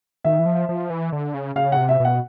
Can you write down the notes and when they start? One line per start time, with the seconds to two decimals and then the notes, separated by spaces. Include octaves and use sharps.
0.24 D#3 E5
0.39 E3
0.46 F3
0.69 F3
0.90 E3
1.13 D3
1.34 C#3
1.56 C#3 F5
1.72 C3 F#5
1.89 E5
2.00 B2 F#5